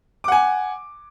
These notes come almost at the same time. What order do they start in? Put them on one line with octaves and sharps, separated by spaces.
D6 F#5 G#5